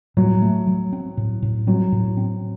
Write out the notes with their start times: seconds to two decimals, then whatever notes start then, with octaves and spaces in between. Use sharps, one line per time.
0.17 A2 F#3
0.42 A3
0.67 F#3
0.93 C4
1.17 A2
1.42 A2
1.67 F#3 C4
1.92 A2
2.17 C4